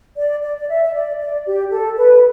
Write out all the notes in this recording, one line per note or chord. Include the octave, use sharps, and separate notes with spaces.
D5
D5
D5
E5
E5
D5
D5
G4
A4
B4